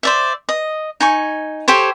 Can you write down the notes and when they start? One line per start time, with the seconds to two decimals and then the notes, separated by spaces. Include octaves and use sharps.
0.03 C5 D5 E5
0.49 D#5
1.00 D#4 G#5 C#6
1.68 G4 A4 C5 C#5